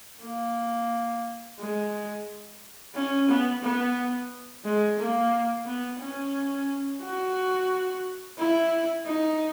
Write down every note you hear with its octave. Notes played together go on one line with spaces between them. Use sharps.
A#3
G#3
C#4
B3
B3
G#3
A#3
B3
C#4
F#4
E4
D#4